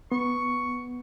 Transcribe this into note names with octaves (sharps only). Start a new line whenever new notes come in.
B3 C#6